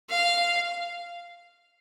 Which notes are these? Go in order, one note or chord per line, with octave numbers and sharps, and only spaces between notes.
F5